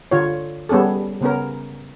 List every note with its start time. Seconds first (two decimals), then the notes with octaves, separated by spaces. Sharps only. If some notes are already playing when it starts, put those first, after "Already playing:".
0.11 D3 F4 C#5
0.69 G3 B3 C#4 G#4 A4
1.21 C#3 B3 C#4 A#4